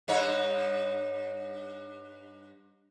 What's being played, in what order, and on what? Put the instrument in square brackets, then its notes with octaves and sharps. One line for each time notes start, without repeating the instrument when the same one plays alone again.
[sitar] G2 D#4 C#5